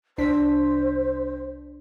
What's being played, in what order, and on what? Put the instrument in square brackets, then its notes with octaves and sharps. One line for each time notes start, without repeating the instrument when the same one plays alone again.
[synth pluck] C2 D4 B6 [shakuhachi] C5